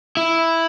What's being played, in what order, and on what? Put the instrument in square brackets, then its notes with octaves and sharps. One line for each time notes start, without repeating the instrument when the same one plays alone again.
[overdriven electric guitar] E4